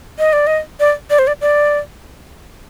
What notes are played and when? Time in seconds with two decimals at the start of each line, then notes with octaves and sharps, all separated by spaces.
0.19 D#5
0.33 D5
0.47 D#5
0.80 D5
1.10 D5
1.19 C5
1.27 D5
1.41 D5